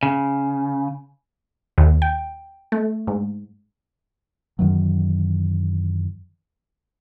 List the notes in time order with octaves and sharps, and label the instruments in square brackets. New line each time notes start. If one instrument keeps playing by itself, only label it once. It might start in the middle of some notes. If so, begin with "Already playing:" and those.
[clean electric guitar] C#3
[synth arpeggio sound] D#2
G5
A3
G#2
[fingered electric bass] F#2 D#3 E3 F#3